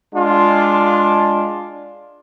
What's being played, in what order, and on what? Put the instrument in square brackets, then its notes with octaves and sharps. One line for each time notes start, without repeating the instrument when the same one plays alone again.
[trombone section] G#3 D4 F4